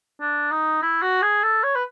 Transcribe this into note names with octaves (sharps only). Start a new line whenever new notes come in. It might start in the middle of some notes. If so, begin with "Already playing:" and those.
D4
D#4
E4
F#4
G#4
A4
C#5
B4